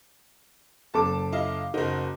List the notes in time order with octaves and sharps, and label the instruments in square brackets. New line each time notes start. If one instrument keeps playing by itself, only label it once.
[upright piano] F#1 A4 D6 [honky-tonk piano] A5
[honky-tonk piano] E4 D#5 F5
[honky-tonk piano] F#1 D#4 [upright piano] F#4 A#4 C5